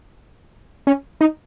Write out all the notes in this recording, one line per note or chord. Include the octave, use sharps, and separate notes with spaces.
C#4
D#4